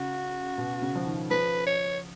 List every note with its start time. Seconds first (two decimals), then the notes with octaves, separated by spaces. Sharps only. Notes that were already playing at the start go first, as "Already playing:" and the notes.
Already playing: C#3 F#4
0.58 B2
0.82 C#3
0.96 F3
1.06 D#3
1.30 F3 B4
1.66 C#5